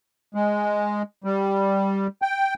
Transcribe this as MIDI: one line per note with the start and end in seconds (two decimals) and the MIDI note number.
0.35 1.02 56
1.24 2.07 55
2.22 2.54 79